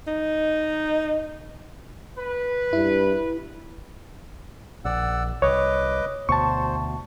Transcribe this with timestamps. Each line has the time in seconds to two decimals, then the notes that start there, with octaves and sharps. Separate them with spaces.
0.07 D#4
2.19 B4
2.73 G2 E4
4.85 A#1 D5 F#5 E6
5.42 C2 B4 C#5 D#5 D6
6.29 D2 B2 C5 A5 C#6